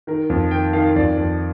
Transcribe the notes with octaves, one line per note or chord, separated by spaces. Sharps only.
D#3 A#4
F2
D#3 G5
D#3 F5
F2 D5
F2